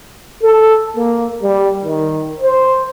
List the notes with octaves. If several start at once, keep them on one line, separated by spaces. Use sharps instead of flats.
A4
A#3
G3
D#3
C5